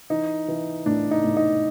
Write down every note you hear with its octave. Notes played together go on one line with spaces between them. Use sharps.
E3 D#4
E3
A2 D4
D#4
A2
D#4